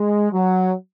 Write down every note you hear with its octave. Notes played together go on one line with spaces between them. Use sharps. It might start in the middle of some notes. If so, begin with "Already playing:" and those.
Already playing: G#3
F#3